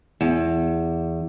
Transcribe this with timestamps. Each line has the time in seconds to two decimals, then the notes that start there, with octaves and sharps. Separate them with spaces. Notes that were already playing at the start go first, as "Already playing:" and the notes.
0.21 E2